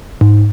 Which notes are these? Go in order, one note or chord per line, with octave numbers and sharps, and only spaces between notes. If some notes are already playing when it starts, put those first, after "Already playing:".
G#2